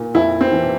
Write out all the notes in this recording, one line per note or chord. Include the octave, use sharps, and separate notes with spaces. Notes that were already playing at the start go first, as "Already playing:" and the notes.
Already playing: A#2
F2 E4
C4
E3